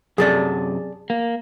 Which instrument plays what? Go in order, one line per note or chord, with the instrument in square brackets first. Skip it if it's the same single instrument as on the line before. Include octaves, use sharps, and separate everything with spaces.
[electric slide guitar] F#2 C3 [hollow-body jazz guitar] G#4 A4 D5
[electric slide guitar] A#3